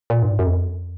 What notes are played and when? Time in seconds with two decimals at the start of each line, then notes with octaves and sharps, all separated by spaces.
0.10 A#2
0.23 G2
0.29 G#2
0.39 F#2
0.46 F2